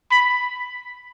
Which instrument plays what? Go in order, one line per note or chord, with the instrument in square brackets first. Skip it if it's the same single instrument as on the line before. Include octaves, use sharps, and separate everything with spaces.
[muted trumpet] B5